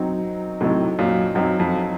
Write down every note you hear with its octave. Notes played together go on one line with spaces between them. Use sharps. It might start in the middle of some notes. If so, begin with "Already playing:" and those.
Already playing: F#3 C4 D#4
A2 C3 F#3 C4 D#4
F#2 A#2
F#2 F#3 C4 D#4
F2